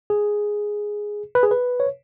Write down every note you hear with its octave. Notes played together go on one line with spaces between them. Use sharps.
G#4
B4
G#4
B4
C#5